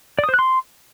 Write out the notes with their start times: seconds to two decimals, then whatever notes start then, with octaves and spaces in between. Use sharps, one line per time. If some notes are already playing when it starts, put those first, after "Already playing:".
0.19 D5
0.24 D#6
0.29 C5
0.34 F#6
0.39 C6